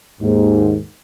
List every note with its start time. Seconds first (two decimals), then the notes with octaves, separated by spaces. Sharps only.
0.21 D#2 G#2